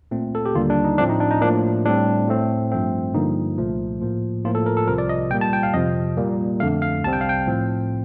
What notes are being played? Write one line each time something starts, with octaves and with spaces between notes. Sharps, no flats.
A#2 A3 C4
A4
G4
D#2 D3 G3 A#3 F4
D4
D#4
A2 F3 A3 C4 D4
D#4
D4
D#4
A2 F3 A#3 D4
A2 G3 C4 D4
A2 A3 C4
G2 F3 A3 C4
G2 D3 F3 A#3 D#4
C2 A#2 F3 A3
A2 F3 A#3
A2 F3 A#3 F4
A4
A#4
A4
C2 C3 F3 A#4
D5
D#5
A#2 G3 A#3 G5
A5
G5
F5
F2 C3 F3 D#5
A#2 G3 A#3
F2 D3 A3 F5
F5
C2 C3 G3 C4 A5
G5
F5
G5
A2 F3 C4